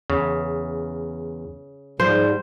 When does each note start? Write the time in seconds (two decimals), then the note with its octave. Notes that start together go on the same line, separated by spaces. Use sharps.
0.10 E2 C#3
2.00 G#2 F3 G3 C5